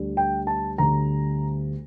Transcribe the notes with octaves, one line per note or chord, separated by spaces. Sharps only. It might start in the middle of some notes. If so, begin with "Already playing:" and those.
Already playing: D2 D3 G3
G5
A5
D2 D3 G3 A#5